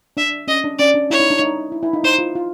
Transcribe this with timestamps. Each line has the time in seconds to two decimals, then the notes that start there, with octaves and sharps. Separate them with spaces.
0.17 D4 E5
0.48 C#4 D#5
0.64 D4
0.79 C#4 D5
0.95 D4
1.11 E4 C#5
1.20 D#4
1.30 D4
1.40 D#4
1.72 E4
1.83 E4
1.93 D#4
2.04 D#4 C5
2.19 F4
2.35 F4